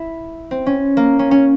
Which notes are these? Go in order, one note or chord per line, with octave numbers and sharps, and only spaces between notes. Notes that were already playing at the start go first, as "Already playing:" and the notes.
Already playing: E4
C4
C#4
A#3
C#4
C#4